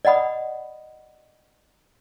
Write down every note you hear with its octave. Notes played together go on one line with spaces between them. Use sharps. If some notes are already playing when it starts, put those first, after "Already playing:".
D5 D#5 F#5 B5 D#6